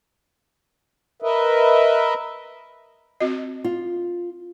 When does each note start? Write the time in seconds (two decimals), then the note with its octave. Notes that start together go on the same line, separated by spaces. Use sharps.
1.22 A#4 B4 D#5 E5
3.20 C4 F#4 D#5
3.64 F4